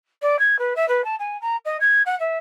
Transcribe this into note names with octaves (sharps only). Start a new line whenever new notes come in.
D5
G#6
B4
E5
B4
A5
G#5
A#5
D#5
G#6
F#5
E5